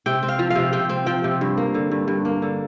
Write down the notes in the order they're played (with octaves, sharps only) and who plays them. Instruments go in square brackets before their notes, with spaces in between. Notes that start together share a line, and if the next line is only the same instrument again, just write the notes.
[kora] C3 G5
C4
F5
F3
F5
C3
C3 G5
C4
F3 G5
C3
G2
A#3
D3
G2
G2
A#3
D3